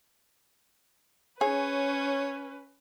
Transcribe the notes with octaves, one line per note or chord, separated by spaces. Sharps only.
C#4 G#4 B4 C#5